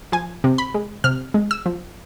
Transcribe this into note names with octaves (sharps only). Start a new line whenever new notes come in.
F3 G#5
C3
B5
G#3
C3 F6
G#3
E6
F3